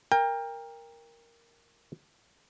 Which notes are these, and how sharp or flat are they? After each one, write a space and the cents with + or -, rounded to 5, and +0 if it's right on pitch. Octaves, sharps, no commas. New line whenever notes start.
A#4 +0 G5 +30